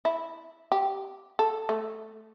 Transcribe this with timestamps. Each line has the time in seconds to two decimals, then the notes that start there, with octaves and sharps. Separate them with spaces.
0.05 E4
0.72 G4
1.39 A4
1.69 A3